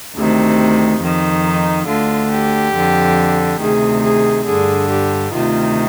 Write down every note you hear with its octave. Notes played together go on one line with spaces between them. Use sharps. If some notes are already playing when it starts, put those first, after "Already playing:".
D2 C3 D#3
F2 D#3
D#4
D2 D3 F4
G4
F2 D3
D2 C3 D#3 G#4
G#4
G2 D3 G#4
G4
D2 C3 D#3 F4